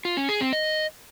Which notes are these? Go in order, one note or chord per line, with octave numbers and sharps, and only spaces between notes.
F4
C#4
G#4
C4
D#5